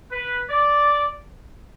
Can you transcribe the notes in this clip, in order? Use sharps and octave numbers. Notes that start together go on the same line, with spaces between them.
B4
D5